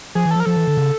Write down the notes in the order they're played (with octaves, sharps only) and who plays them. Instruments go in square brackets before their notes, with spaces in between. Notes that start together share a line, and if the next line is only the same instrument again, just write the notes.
[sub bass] F3 [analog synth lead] G#4
[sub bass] E3
[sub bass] F3 [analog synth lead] A4
[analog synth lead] A#4
[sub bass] F3 [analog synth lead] A4
[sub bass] E3
D3
C#3